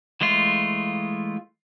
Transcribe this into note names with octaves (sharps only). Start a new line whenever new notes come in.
E3 G#3 A3 F4